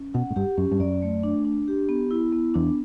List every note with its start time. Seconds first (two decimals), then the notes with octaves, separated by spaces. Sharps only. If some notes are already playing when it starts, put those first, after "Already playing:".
Already playing: C#4
0.14 B2 F#5
0.30 A2
0.36 G2 G4
0.58 F#2 C#4
0.71 G2
0.80 F#2 D5
1.02 A3
1.23 D4
1.45 D4
1.68 G4
1.89 B3
2.11 E4
2.32 B3
2.54 E2 D4